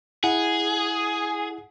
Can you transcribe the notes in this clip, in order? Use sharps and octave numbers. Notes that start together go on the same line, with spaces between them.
E4 G#4 F#5